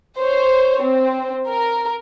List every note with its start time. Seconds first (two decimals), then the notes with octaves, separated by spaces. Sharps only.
0.18 C5 C#5
0.82 C4
1.47 A#4